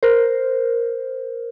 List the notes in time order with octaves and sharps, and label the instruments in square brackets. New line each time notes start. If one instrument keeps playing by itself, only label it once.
[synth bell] A#4 C5